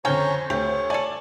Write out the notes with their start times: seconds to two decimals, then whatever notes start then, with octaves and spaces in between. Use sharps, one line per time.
0.05 F2 D3 C#4 C5 C#5 G5 G#5 A#5
0.50 D2 G4 C#5
0.90 A4 D5 G#5 A5